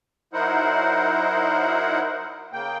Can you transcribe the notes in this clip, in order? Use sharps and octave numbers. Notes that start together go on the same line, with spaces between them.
F#3 D#4 E4 A#4 C5 F#5
C#3 A#3 G5